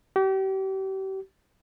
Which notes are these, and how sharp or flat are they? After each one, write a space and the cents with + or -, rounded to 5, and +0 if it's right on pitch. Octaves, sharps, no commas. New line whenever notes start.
G4 -35